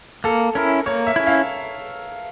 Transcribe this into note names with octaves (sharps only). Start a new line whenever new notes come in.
A#3 A4
C#4 E4 A#4
A#3 C#5
E5
C#4 E4
F5